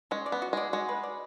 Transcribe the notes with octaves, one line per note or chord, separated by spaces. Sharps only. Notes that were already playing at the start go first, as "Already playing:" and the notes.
G#3 C#4
D5
B3
F#4
G#3 D5
G#3 F#4
B4
D5